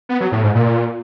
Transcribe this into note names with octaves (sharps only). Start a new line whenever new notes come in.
B3
F#3
A2
G#2
A#2